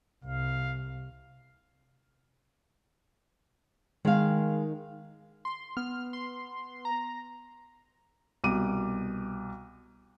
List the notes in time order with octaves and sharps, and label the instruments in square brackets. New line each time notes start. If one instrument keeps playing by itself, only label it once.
[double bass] C2 [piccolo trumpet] F5
[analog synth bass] D#3 [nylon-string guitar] G#3 F5
[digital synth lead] C6
[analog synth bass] B3 [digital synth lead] F6
[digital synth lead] C6
A#5
[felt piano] C2 B2 D6 D#7